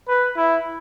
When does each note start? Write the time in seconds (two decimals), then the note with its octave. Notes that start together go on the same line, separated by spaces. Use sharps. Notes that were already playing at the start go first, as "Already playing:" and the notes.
0.08 B4
0.37 E4